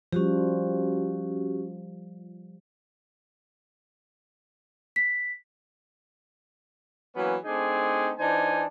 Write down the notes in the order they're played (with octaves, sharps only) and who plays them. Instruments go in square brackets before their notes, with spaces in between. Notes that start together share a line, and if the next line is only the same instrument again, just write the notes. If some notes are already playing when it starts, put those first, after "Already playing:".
[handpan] F3 G3 [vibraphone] C#4 F#4 G4
[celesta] B6
[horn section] E3 F#3 A#3 B3 C#4
A3 C4 D4 D#4 G#4
E3 D4 D#4 C5 G#5